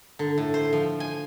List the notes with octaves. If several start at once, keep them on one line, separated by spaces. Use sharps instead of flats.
D3
A2
C5
F3
G#5